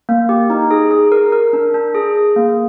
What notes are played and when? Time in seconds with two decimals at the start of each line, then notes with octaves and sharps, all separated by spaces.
0.09 A#3
0.29 G4
0.50 D#4
0.71 G#4
0.91 G#4
1.12 A#4
1.32 A#4
1.53 D4
1.74 D4
1.95 G#4
2.15 G#4
2.36 A#3